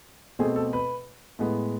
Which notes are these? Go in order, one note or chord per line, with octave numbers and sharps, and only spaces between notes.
B2 A3 C4 G#4
A4
B4
A2 G#3 B3